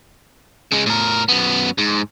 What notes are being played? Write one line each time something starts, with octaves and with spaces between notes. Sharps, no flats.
C#3 G#3
A2 A#4
F#2 B3
G#2